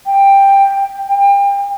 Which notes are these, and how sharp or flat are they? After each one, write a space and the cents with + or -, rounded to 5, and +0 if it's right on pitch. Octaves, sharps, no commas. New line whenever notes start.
G5 +10
G5 +35